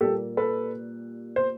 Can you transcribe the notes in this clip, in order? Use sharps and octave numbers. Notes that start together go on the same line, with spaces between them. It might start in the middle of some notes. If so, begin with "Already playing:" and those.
A#2 G3 A#3 G4 A4
A4 B4
C5